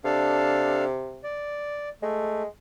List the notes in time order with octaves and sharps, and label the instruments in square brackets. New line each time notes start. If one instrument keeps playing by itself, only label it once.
[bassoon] C3 [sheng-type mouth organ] D4 A4 F5
[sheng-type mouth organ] D5
[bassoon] G#3 [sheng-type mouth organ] A3